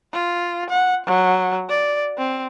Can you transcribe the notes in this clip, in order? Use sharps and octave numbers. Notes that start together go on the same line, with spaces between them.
F4
F#5
F#3
D5
C4